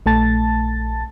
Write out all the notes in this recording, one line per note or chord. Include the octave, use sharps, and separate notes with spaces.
A#1 A3 A5 A6